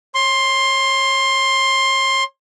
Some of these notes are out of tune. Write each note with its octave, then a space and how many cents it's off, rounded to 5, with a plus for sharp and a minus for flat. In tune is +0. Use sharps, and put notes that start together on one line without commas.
C#5 -20 C6 +15